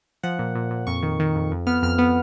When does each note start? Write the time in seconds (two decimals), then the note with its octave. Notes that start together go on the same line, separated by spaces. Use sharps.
0.23 F3 F#5
0.39 A#2
0.55 A#2
0.71 A#2
0.87 F2 C#6
1.03 D#3
1.20 D#3
1.35 F2
1.51 F2
1.67 B3 F6
1.83 F2 F6
1.98 B3